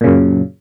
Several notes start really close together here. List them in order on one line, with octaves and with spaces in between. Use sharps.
A#2 C#3 F#2